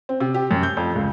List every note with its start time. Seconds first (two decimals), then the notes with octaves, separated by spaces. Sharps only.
0.09 C4
0.20 C3
0.34 G4
0.51 F#2
0.63 G6
0.77 F2
0.95 C#2